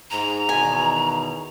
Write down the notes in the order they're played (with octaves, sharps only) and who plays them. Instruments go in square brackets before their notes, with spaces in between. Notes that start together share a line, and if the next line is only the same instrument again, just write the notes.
[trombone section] G#2 [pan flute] A#5
[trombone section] E2 B2 D#3 [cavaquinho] G#5